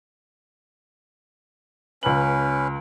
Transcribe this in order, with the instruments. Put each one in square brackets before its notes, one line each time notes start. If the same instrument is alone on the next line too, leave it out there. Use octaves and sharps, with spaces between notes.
[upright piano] C#2 F#7 [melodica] C#4 B4